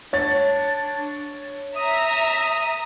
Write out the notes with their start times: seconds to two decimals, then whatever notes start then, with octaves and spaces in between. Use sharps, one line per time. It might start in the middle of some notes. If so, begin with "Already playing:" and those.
0.13 D4 C#5 A6
1.76 E5 A#5 D#6